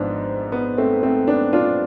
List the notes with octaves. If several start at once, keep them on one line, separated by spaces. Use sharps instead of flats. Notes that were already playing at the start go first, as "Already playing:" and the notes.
Already playing: G#1 G#2 F3 B3 D4
B3
A3 C4
A3 C4
B3 D4
D4 F4